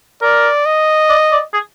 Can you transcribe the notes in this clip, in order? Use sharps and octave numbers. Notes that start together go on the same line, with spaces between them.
A#4 D5
D#5
D5
D5
G#4